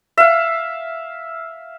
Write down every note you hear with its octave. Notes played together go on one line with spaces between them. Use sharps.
E5 F5